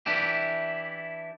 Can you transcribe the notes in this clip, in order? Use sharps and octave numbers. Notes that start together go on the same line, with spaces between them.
E3 D4 E4 G4